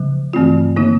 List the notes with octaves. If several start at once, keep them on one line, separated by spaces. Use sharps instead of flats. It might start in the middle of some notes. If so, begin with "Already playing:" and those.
Already playing: C#3 F3
G2 E3 A3 C4 F4
D3 F3 A#3 D#4